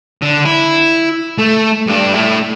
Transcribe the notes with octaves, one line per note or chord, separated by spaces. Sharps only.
D3
E4
A3
G2 D4
A3 E4